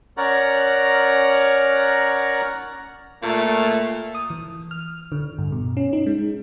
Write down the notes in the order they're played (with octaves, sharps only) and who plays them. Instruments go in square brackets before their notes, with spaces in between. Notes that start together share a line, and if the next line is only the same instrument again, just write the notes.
[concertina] C#4 A#4 C#5 D5 F#5 A#5
[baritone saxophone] A#2 [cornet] A3
[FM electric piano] D#6
E3
F6
D3
G2
B2
C#4
D#4
G#3